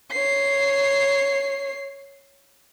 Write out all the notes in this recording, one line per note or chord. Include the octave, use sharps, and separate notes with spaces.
C#5 C7